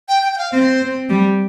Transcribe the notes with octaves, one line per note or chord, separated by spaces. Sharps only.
G5
G5
G5
F5
C4 C5
C4
G3